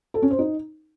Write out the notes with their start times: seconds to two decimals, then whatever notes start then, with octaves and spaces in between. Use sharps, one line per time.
0.14 A4
0.22 C#4
0.31 C5
0.39 D#4